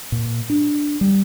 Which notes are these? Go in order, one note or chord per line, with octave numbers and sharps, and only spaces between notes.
A#2
D4
G3